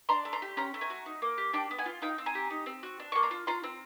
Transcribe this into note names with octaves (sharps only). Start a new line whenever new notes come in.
D4 A#5 C6
A3
A#5 C6
G4
C#4 A#5 C6
A3
G#5 A#5
F#4
D#4
A#3
G4
D4 G5 A5
B3
F#5 G#5
F4
D#4 F5 G5
C4
G#5 A#5
G4
D#4
C4
F#4
D4
A#3 C#6
A#5 C6
F4
F4 A#5 C6
C4